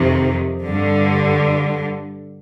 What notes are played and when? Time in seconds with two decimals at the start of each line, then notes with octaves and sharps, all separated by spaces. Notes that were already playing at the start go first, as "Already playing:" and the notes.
Already playing: F2 C3 D#3
0.64 G2 D3